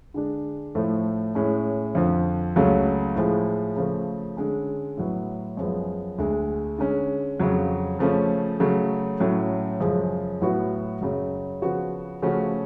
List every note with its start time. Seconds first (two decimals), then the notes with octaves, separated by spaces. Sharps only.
0.14 D3 G#3 D4
0.75 A2 F3 A3
1.35 A2 G#3 C#4
1.95 F2 D3 F3
2.56 C#2 C#3 F#3 A3 C#4
3.16 A2 F3 G#3
3.76 C#3 F3 A3
4.37 D3 G#3 C#4
4.97 A2 F#3 B3
5.57 F#2 F3 G#3 B3
6.18 D2 D3 G#3
6.78 D3 G#3 C#4
7.40 F2 C#3 F#3
7.99 C#3 F3 A3 C#4
8.60 C#3 F#3 A3
9.20 A2 F#3 A3 C#4
9.80 F#2 C#3 F3 G#3
10.42 A2 F#3 B3 F#4
11.01 F#2 C#3 F#3
11.62 C#3 F3 B3 F#4
12.22 C#3 F3 A3 C#4 F#4